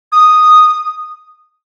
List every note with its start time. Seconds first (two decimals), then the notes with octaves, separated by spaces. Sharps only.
0.12 D#6